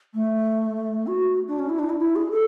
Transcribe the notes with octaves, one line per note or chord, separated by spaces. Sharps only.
A3
F#4
D4
C#4
E4
D4
E4
E4
G#4
A4